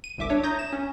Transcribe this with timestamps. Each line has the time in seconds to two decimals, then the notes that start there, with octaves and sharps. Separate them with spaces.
0.04 D#7
0.18 G1 C2 E5 D6
0.29 D4 C#5 E5
0.43 A#5 D#6 G6 G#6 A#6
0.59 E7
0.73 C#4